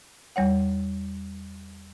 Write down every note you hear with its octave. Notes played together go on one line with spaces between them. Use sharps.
E2 G3 C#5 F#5